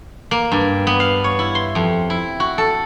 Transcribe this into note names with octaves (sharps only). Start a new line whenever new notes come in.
A#3
G2
B3
F5
C#5
E4
C6
F2
E4
F#4
A4